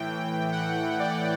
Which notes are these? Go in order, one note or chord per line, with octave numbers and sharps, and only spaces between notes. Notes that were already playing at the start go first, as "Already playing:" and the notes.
Already playing: A2 E3 G5
F#5
D5